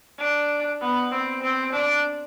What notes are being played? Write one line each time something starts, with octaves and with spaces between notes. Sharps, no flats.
D4
B3
C4
C4
D4